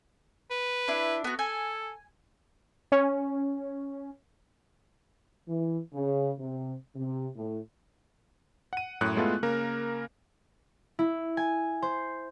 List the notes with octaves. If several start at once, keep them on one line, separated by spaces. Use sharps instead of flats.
B4
D4 E4
B3 F#4
A4 G#5
C#4
E3
C#3
C3
C3
A2
F#5 D#7
F#2 A2 F#6 C#7
G#3 A3 B3 E4 F4 A4
C#3 A#3 A#4
E4
G#5
C5